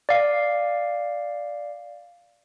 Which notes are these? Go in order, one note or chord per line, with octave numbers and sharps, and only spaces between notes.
D5 F5